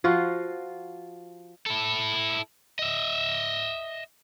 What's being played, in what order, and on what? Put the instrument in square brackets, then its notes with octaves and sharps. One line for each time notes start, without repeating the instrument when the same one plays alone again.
[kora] F3 F4 F#4
[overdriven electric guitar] E4 A4
D#5 E5